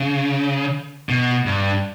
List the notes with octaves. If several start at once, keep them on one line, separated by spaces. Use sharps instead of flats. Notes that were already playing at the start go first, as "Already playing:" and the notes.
Already playing: C#3
B2
G2